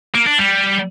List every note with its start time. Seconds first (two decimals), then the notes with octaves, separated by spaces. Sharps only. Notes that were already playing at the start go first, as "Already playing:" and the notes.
0.15 A#3
0.27 D4
0.39 G3